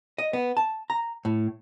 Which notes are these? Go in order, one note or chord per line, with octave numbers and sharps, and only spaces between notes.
D#5
B3
A5
A#5
A2